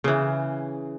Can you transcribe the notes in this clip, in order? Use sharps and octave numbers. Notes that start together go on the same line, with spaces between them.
C#3 E3